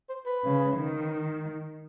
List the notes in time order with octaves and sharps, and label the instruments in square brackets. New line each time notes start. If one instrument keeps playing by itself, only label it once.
[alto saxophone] C5
B4
[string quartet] C#3
D#3